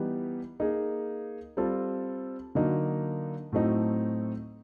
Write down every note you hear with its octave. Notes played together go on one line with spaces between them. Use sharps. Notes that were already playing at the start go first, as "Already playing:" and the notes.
Already playing: E3 G3 B3 D#4 G4
A#3 D#4 G#4
G3 C4 F4 A4
D3 F#3 A#3 D#4
A2 F#3 A3 C4 D#4